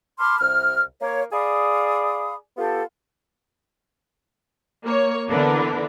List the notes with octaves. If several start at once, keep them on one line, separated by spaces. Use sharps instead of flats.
A5 B5 C6 D6 F6
C2 F6
A#3 C#5
G#4 D5 F5 B5 D#6
B3 F4 G4 A4
A#3 C#5
D3 E3 B3 D4 A#4 B4